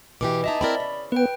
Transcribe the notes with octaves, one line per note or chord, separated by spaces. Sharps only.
B2 E3 G4 D6
D#4 E4 G#4 D#5 E5 A5
C4 E4 A#4 D5 B5
C#3
B3 B4 G5